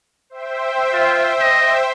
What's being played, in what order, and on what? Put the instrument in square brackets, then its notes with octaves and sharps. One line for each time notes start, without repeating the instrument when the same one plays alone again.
[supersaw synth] C5 E5 G5
[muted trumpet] F4
D#5